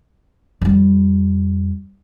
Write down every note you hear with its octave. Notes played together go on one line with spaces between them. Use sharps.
F2 G3